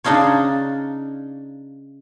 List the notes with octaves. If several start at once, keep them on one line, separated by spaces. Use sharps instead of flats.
C#3 D4 D#4 F4 C#5